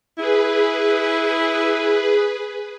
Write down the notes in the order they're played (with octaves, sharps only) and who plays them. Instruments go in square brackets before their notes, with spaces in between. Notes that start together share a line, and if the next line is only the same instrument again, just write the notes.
[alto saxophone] E4 [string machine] G#4 B4